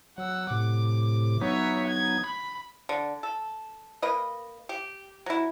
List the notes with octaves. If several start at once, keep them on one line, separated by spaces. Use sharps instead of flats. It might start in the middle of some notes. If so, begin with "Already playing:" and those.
F#3 F#5 E6
A2 C3 D6
F#3 B3 D#4 C#5 E5
G#6
B5
D3
A4
A#3 B4 D#5
G4
F#3 E4